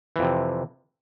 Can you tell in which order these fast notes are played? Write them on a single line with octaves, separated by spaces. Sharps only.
E3 F2 C3